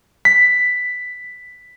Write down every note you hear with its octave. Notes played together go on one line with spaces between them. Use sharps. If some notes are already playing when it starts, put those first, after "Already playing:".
B6